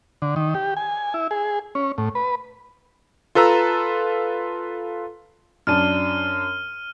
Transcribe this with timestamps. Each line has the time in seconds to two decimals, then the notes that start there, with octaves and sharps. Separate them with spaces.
0.22 D3
0.36 D#3
0.55 G4
0.77 G#5
1.14 E4
1.31 G#4
1.75 C#4
1.98 A2
2.15 B4
3.35 F4 A4 B4 A#5 E6
5.67 F#2 D4 A5 F6 D#7